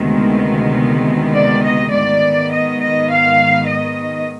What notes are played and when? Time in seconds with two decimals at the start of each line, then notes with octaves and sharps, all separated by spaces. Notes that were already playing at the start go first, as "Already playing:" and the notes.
Already playing: D2 C3 D#3 G#3 B3
1.35 D5
1.65 D#5
1.93 G#2 D#3 B3 D5
2.53 D#5
2.82 D#5
3.12 F5
3.69 D#5